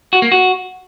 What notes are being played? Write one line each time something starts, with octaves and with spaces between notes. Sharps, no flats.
F#4
A#3
F#4